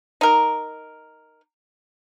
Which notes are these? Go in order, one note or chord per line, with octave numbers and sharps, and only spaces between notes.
D#4 A#4